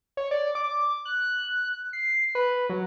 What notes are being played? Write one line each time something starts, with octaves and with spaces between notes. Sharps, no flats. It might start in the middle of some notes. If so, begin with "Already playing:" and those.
C#5
D5
D6
F#6
C7
B4
F#3